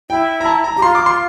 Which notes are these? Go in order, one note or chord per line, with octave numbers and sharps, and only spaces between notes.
E4 G5
A#5
A5
A#5
G4 A#5
F4 C6
D6
C6